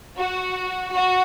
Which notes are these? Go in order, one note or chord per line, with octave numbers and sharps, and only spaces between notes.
F#4
F#4